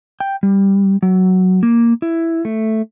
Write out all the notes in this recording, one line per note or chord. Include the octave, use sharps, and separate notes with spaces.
G5
G3
F#3
A#3
E4
A3